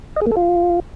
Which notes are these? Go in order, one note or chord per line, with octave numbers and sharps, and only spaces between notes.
D#5
G#4
A#3
A4
F4